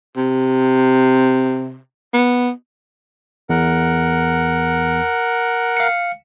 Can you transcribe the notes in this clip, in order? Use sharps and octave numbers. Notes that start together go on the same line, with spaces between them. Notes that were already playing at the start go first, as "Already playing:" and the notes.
C3
B3
E2 A#4 F#5
F5 C#7